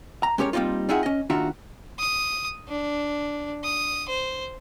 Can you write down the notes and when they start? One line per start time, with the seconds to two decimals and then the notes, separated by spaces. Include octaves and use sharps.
0.23 A#5
0.38 G#3 C#4 G4 A#4 C#5
0.53 G3 A#3 C4 D#4 F4
0.89 C4 D#4 F4 G#4 E5 F#5
1.03 C#4 D#5
1.30 D#2 D4 F4 F#4 E5 A#5
1.99 D#6
2.68 D4
3.64 D#6
4.09 C5